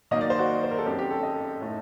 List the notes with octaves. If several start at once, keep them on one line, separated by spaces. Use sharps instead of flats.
D#3 F#3 A#3 D#4 D#5
D5
C5
F#4
C5
A#4
A4
F#2 F#3 C4 D#4 G4
G4
A4
D#5
A2 A3 D#4